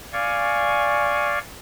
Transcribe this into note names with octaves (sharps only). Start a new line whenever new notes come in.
D5 F5 G#5 C#6